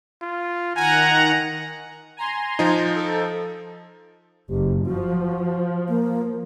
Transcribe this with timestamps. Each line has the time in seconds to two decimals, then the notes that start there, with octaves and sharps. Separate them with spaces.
0.22 F4
0.76 D#3 F#5 G#5 A#5
2.17 G#5 A#5 C6
2.59 F3 D#4
2.95 A4
4.50 F#1 G4
4.86 F3 F#4
5.89 A#3